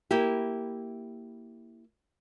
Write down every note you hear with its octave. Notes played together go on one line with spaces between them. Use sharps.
A#3 E4 G4